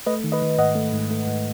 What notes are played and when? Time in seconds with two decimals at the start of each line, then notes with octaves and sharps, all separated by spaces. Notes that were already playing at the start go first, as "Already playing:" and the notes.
0.06 A3 B4 D#5
0.24 D#3
0.32 B4 D#5
0.42 D#3
0.58 G#2 D#5 F#5
0.75 A3
0.93 G#2
1.11 A3
1.27 G#2